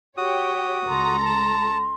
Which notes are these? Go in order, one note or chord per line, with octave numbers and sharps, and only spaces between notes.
F#4 G4 C#5 G5 D#6
C#2 A4 A#5 C6
A5